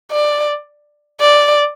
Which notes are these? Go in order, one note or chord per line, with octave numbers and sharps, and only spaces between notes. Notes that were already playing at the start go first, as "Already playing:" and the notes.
D5
D5